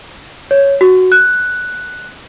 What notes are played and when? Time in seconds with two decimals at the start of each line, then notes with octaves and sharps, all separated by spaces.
0.51 C#5
0.81 F#4
1.12 F#6